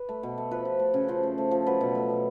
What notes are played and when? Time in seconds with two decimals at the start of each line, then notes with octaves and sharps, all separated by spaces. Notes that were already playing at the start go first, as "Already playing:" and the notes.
Already playing: B4
0.09 A3
0.23 B2
0.38 A3
0.51 F3 B4
0.65 F3
0.79 A3
0.94 C#3
1.08 F3 C5
1.23 A3
1.38 A3
1.51 F3
1.67 F#3 B4
1.81 B2
1.95 A3
2.10 B2